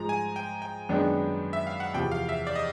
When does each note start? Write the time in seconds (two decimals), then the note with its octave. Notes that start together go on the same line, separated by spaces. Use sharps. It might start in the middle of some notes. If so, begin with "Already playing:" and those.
Already playing: G#2 F3 G#3 A#5
0.09 G#5
0.36 G5
0.62 G5
0.89 F#2 D#3 G#3 B3 D4
1.53 E5
1.67 F5
1.80 F#5
1.94 E2 C3 F3 G5
2.12 F5
2.29 E5
2.47 D5
2.56 D#5